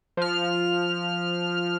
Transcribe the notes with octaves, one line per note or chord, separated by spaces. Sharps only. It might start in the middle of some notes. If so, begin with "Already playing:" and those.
F3 F6